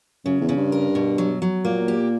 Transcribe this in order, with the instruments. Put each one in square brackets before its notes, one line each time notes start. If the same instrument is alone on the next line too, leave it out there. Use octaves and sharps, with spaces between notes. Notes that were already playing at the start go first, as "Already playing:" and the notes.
[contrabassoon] F#2 [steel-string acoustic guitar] C#3
[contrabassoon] E2
[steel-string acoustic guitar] C#3
[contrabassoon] G2
[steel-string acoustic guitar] A#4
B2
F#3
F#3
[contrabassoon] A#2 [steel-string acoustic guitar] A#3
[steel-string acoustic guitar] G4